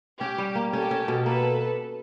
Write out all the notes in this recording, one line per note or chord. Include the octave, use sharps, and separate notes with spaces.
C#4 G4
G3
A#3
C#4 G4 A4
C#4
B2
A#3 A4 B4